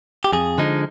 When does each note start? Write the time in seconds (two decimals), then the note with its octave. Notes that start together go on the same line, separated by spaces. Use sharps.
0.24 G4
0.33 F2 G#4
0.58 D3 F3 G#3 D#4